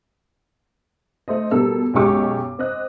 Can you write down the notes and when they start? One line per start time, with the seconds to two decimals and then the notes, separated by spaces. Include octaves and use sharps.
1.28 A3 C5 D#5
1.51 B2 G3 A4 A#4 E6
1.94 B1 F#2 G#3 G4 C#6 D6
2.59 C4 D#5 F#6